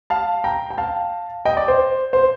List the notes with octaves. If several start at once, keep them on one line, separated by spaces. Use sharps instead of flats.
F5 A5
G5 A#5
G5
F5 A5
D#5 G5
D5
C5
C5